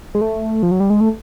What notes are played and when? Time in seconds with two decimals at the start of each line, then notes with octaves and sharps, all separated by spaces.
0.15 G#3
0.21 A3
0.63 F3
0.71 F#3
0.80 G3
0.90 G#3
1.00 A3